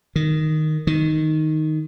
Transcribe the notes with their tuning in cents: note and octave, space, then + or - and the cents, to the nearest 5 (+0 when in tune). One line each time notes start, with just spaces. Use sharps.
D#3 -5
D#3 +0